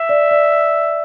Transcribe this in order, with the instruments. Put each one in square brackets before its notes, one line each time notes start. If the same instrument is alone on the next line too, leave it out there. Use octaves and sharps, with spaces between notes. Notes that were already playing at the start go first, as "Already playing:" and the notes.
Already playing: [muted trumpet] E5
[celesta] D5
D5